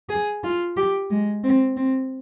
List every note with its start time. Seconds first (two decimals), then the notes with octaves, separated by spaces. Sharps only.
0.09 G#4
0.43 F4
0.77 G4
1.10 G#3
1.44 C4
1.77 C4